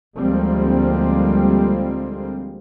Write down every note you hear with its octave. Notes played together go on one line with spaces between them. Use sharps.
D2 F3 G3 G#3 A#3 C4